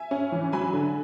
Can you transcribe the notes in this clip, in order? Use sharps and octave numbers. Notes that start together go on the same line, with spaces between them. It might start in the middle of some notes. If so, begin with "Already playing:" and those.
Already playing: E5 G#5
C#4
E3
F#3 G#5 B5
D3